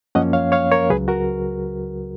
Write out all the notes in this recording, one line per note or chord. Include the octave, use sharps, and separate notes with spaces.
F#2 F3 A#3 C#4 D#5 F#5
C#5 F5
C#5 F5
A#4 C#5
C#2 C#3 F#3 G#4 B4
F#4 A#4